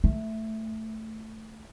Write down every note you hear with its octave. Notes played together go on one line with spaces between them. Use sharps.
A3